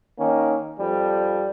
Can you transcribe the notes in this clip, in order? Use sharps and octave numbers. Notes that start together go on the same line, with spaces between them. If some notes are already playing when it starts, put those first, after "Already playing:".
D#3 A#3 C#4
F2 F3 G3